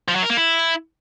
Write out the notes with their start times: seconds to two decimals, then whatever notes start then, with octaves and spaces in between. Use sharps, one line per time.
0.08 F3
0.16 F#3
0.23 A#4
0.30 A#3
0.37 E4